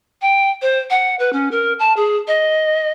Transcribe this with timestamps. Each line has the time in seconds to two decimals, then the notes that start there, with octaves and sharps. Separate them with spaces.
0.22 G5
0.62 C5
0.90 F#5
1.19 B4
1.33 C#4
1.51 A#4
1.79 A5
1.97 G#4
2.28 D#5